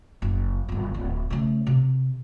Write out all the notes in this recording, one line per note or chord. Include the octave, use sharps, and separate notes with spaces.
F#1
D1 G1
D1
C#3 A3
C3